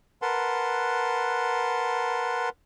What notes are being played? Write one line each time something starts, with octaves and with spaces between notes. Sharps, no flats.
A#4 B4 F#5 A5 C6